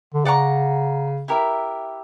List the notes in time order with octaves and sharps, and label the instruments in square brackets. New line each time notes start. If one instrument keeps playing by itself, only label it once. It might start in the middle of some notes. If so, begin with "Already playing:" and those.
[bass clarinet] D3
[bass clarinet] C#3 [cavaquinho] D5 F#5 A#5 C#6
[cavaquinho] E4 G4 A#4 E5